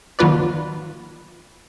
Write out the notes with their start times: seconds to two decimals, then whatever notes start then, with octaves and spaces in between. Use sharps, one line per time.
0.19 D#3 F#3 A#3 F4 B4 D5